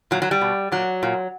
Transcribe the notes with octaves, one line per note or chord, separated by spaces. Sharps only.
A#2 F#3
F#3
G3
B2
A#2 F#3
A#2